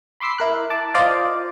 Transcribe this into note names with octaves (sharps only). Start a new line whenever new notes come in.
B5 C6 D6 E6 B6 C7
E4 A#4 F#6
A5 D6
F4 C5 D5 D#5 F5